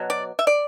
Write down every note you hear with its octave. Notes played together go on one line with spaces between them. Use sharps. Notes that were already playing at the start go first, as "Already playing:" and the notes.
Already playing: B2 F#3
D5
E5
D5